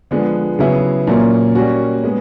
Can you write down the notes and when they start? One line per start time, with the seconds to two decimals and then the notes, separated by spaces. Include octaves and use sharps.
0.11 D3 F3 G#3 B3
0.59 C#3 F#3 B3 E4 G#4
1.07 A#2 F#3 A#3 C#4
1.55 G3 A#3 C#4 F#4
2.04 G#3 B3